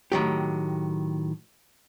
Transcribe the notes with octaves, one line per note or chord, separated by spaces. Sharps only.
A2 D#3 F#3 G4